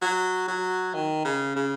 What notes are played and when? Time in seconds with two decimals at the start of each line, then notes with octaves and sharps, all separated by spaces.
0.02 F#3
0.48 F#3
0.94 D#3
1.25 C#3
1.56 C#3